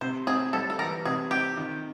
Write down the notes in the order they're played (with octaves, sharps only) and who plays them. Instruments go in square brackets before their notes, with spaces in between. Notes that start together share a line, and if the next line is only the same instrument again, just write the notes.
[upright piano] C3 [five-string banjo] C5
[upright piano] C4 [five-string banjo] G#4
[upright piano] G3 [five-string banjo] A4
[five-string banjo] A4
[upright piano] E3 [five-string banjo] A#4
[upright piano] C3 [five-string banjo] G#4
[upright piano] C4 [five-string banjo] G4
[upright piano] D#3